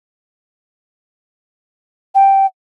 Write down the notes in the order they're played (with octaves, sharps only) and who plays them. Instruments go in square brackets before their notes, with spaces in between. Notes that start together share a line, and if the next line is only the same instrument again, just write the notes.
[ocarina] G5